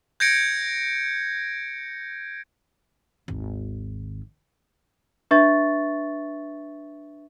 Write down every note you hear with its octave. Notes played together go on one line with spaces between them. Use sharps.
G6 G#6 A#6 C#7 D7
G#1 D#2
D4 B4 E5 C#6 A6